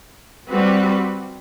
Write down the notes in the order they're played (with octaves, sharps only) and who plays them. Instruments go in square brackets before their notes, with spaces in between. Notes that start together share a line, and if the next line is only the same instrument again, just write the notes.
[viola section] G3 C4 F#4 B4